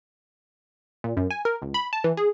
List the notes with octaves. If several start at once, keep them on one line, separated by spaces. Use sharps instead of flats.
A#2
F#2
G#5
A#4
C#2
B5
A5
E3
G#4